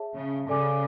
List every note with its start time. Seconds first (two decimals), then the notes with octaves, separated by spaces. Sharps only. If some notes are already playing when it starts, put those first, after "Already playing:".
Already playing: G#4 C#5 E5 A5
0.15 C#3
0.48 C#3 A4 D5 G#5 D6